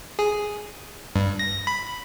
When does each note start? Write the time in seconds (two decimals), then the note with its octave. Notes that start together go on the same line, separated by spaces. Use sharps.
0.19 G#4
1.16 G2
1.39 A#6
1.67 B5